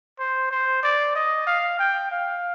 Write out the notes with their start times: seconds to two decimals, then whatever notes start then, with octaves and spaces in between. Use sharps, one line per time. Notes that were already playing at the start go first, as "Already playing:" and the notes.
0.19 C5
0.51 C5
0.83 D5
1.15 D#5
1.47 F5
1.79 G5
2.12 F5